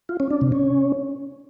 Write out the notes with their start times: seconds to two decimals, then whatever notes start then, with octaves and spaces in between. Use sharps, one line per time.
0.09 F4
0.20 C#4
0.31 D4
0.41 C3
0.52 C#4